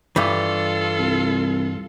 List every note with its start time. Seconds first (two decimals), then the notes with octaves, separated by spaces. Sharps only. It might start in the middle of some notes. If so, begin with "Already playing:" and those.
0.16 G2 E3 F4 A4
0.99 C2